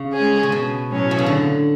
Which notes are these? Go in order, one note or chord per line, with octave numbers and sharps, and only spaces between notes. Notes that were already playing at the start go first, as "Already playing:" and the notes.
Already playing: C#3
G#3 C#4 G#4
C#3
B2
A2 F#3 C#4
B2
C#3
D3